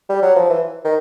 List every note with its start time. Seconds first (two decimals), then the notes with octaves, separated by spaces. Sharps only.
0.09 G3
0.22 F#3
0.36 F3
0.50 E3
0.85 D#3